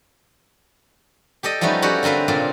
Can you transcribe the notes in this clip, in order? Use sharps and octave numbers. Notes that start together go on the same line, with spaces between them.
G4 A4 D5 D#5
F3 G3 A3 B3 C#4 D#4
C#4 F#4 G4 A4 D5
D3 C4 A#4 B4 F5
A#2 C#3 C4 D5